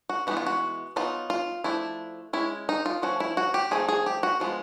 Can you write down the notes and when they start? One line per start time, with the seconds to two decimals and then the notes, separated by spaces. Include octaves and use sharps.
0.09 F#4
0.27 E3 G#3 B3 D#4 F#4
0.37 F4
0.46 F#4
0.96 F#3 B3 D#4 F4
1.30 F4
1.64 F3 A3 D4 E4
2.33 G#3 C#4 E4
2.69 D#4
2.86 F4
3.02 F3 A3 C#4 F#4
3.20 E4
3.37 F#4
3.54 G4
3.71 F3 A3 C4 D#4 G#4
3.88 G#4
4.06 G4
4.23 F#4
4.40 F3 G#3 B3 F4